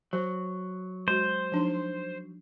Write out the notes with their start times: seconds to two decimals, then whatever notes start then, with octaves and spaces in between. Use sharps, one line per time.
0.13 F#3 C5
1.08 G#3 F#4 C5
1.52 F3 D4 D#4